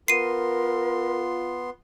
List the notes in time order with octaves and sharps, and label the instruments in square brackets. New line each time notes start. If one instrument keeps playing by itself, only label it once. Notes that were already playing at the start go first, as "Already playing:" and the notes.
[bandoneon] B3 C6 [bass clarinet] F4 [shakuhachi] A#4 [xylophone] C7 D#7